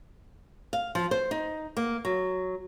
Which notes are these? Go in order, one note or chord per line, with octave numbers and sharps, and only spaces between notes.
F5
F3
C5
D#4
A#3
F#3